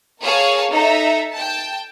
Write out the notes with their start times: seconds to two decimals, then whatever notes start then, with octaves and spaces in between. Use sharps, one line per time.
0.22 G#4 A#4 C#5 F5 A5
0.72 D#4 A4 E5 A#5
1.33 G5 A5